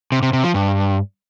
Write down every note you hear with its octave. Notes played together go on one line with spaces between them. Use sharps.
C3
C3
C3
F3
G2